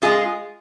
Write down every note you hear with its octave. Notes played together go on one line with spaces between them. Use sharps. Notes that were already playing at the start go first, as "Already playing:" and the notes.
A2 G#3 F4 G#4